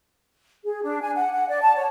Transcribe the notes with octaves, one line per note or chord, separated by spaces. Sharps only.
G#4
D4
G#5
F#5
F#5
D5
A5
C#5